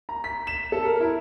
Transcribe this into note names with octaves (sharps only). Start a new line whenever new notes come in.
A#5
B6
E7
A4
A#4
E4